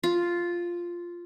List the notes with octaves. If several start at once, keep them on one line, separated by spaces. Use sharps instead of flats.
F4